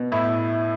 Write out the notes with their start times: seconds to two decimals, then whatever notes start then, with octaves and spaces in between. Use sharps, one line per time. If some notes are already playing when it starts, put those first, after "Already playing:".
Already playing: B2
0.12 A2 E4